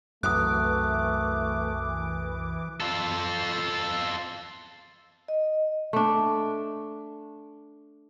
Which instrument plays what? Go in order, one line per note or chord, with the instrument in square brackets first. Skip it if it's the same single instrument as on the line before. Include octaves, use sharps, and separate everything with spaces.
[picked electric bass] C2 F#2 [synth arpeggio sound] E3 D6 [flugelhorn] A3 [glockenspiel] D#6 F#6
[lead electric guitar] F4 A4
[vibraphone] D#5
[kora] A3 D4